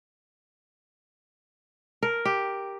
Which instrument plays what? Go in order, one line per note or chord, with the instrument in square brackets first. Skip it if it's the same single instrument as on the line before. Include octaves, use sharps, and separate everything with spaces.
[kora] A#4
G4